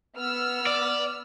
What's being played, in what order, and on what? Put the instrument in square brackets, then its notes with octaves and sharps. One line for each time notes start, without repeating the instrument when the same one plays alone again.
[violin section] B3 E6 F6
[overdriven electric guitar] D5